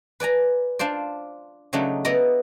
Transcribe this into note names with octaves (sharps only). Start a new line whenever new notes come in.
B4 D5 G#5 A#5
D4 F4 C5 D5
C#3 F#3 A3 D4 D#4
B3 E4 D5 D#5 A#5